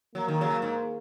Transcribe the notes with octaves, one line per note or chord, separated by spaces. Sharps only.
F#3 A#3
D#3
C#3 F#3
G#2